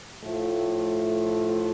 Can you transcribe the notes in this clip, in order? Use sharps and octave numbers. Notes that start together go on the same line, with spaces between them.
A2 F3 A3 F4